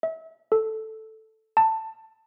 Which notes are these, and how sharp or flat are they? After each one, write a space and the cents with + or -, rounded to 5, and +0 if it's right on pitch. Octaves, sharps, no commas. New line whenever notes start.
E5 -35
A4 +0
A5 +15